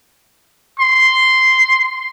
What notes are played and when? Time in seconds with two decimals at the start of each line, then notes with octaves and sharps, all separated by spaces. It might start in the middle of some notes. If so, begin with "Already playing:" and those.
0.80 C6